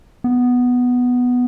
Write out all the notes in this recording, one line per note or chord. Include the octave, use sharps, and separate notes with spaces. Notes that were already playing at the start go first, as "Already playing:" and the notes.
B3